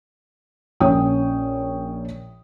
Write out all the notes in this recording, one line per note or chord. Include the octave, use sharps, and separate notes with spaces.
A#1 C#4 C#5 G5 D#6